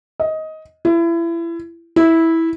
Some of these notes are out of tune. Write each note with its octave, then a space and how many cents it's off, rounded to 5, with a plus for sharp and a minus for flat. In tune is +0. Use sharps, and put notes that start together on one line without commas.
D#5 +15
E4 +30
E4 -10